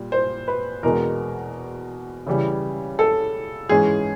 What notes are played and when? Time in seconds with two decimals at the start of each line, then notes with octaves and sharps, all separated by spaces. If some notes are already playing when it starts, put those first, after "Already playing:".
Already playing: A#2 G3
0.12 C5
0.48 B4
0.83 E2 B2 G#3 A#4
2.27 C#3 E3 G3
2.99 A4
3.69 G#2 E3 G#3 C#4 G#4